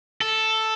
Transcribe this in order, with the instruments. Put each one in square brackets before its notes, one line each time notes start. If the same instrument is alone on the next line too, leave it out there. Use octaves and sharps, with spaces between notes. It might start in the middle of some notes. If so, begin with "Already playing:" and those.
[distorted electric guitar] A4